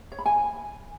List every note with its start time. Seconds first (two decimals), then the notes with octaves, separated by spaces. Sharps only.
0.12 C#5
0.19 B5
0.26 G#5